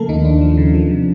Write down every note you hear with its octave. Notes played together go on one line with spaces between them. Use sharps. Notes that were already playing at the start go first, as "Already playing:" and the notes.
Already playing: C#3 F3 A3 A#3 A4 A#4
D#2 D#3 D#4
D#2 D4
F3
C#3
F3
C3